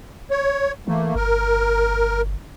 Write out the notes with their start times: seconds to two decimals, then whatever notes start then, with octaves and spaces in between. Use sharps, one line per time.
0.31 C#5
0.88 E3 A3 A#3
1.15 G1 A#4